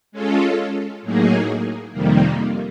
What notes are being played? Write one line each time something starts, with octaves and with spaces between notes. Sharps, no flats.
G#3 C#4 F4 A4
A2 F#3 A#3 D#4 G#4
F2 C3 D#3 G3 A#3